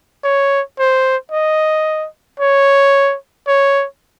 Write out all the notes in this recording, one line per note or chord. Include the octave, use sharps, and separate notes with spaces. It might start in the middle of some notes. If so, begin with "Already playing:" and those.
C#5
C5
D#5
C#5
C#5